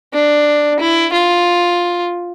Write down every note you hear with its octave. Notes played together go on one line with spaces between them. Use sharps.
D4
E4
F4